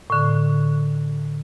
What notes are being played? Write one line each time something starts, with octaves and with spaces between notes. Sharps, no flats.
A2 D3